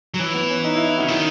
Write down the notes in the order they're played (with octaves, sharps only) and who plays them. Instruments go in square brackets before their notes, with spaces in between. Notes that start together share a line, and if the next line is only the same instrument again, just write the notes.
[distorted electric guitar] F#3
[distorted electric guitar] E3 [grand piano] C#4
[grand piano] B3
C#4
D#4
E4
E4
[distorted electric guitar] C#3 [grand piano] F#4
[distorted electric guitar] D#3 [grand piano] E4